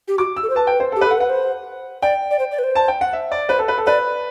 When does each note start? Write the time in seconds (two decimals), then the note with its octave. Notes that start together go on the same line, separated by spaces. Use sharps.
0.08 G4
0.18 F#4 D6
0.37 E6
0.43 A4
0.50 C5
0.55 B4 A5
0.67 G5
0.80 C5
0.92 A4
0.96 G4
1.01 B4
1.07 A4 F#5
1.18 B4 F#5
1.29 C5
2.02 D5 G5
2.31 D5
2.39 C5
2.52 D5
2.59 B4
2.64 C5
2.75 A5
2.88 G5
3.01 F#5
3.13 E5
3.32 D5
3.49 B4 C5
3.59 A4
3.68 B4
3.78 A4
3.86 B4 D5